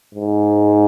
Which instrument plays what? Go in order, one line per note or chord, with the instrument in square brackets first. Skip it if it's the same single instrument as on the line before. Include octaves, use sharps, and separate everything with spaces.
[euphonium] G#2